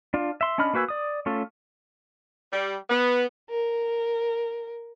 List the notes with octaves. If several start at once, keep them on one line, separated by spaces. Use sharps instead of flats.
D4 F4
E5 C6
C#4 D4 D#5 B5 F6
A#3 F#4 B4 G#5 E6
D5 D#6
A3 C#4 F4 A4
G3
B3
A#4